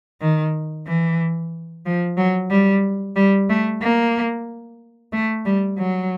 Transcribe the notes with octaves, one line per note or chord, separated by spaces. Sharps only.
D#3
E3
F3
F#3
G3
G3
A3
A#3
A3
G3
F#3